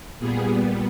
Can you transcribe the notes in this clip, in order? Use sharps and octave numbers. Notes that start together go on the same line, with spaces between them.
A#2 G3 B3 G#4